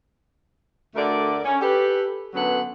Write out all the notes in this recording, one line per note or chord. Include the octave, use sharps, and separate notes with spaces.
D2 D3 A3 A#4 D5
C#4
G4 A4 B4
F#2 D3 F#3 B3 B4 F#5